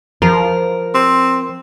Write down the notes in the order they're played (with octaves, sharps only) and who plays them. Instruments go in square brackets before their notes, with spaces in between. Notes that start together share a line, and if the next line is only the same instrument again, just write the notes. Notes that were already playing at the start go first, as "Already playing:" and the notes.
[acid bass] F3 [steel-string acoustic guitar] A#4
[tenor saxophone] C4